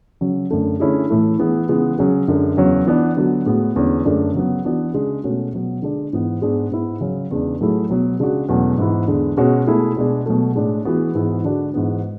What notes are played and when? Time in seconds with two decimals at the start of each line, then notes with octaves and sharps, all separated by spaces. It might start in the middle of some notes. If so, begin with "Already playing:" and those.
0.21 C#3 F#3 C#4
0.51 F#2 D3 A3
0.80 D3 A3 C#4 E4 G#4
1.10 A2 E3 A3 E4
1.39 E3 B3 E4 G#4
1.69 C#3 E3 G#3 B3
1.98 C#3 F#3 C#4 G#4
2.28 F#2 D3 G#3
2.57 E2 C#3 F#3 C#4
2.87 E3 B3 D4
3.17 D3 F#3 B3 F#4
3.46 A2 G#3 B3 F#4
3.76 E2 D3 G#3 C#4
4.05 F#2 D3 A3 D4 G#4
4.34 C#3 F#3 B3
4.64 E3 B3 D4 F#4
4.94 C#3 G#3 D4 G#4
5.24 B2 A3 C#4 F#4
5.53 B2 F#3 B3
5.82 D3 G#3 D4
6.13 G#2 E3 B3
6.42 G#2 G#3 B3 D4 G#4
6.71 G#2 G#3 B3 E4
7.01 C#3 F#3 C#4 G#4
7.31 E2 C#3 G#3 D4
7.60 A2 F#3 A3 E4 G#4
7.89 B2 F#3 B3
8.20 C#3 G#3 D4 F#4
8.49 E2 B2 F#3 A3 C#4
8.78 G#2 E3 B3 E4
9.07 E2 D3 G#3
9.37 B2 G#3 C#4 F#4
9.67 B2 A3 E4 G#4
9.96 B2 G#3 D4 G#4
10.26 B2 F#3 A3
10.56 A2 G#3 D4
10.85 E3 G#3 B3 F#4
11.15 G#2 E3 B3 E4 G#4
11.44 D3 G#3 D4 F#4
11.74 G#2 E3 G#3 B3